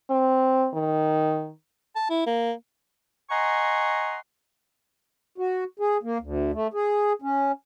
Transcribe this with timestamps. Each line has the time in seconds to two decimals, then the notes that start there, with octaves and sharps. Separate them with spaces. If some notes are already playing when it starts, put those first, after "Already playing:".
0.10 C4
0.74 D#3
1.96 A5
2.10 E4
2.27 A#3
3.31 D#5 F#5 G#5 A#5 C6 C#6
5.38 F#4
5.80 G#4
6.03 A#3
6.21 D2
6.53 A3
6.74 G#4
7.22 C#4